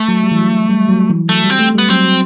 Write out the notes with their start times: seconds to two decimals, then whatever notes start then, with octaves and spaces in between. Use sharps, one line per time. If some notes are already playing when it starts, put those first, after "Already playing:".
Already playing: A3
0.08 F#3
0.24 G3
0.31 E3
0.39 F#3
0.69 G3
0.89 F#3
1.10 E3
1.29 F#3 A3
1.44 G3
1.50 C4
1.59 A3
1.75 G3 B3
1.90 F#3 C4
2.05 F#3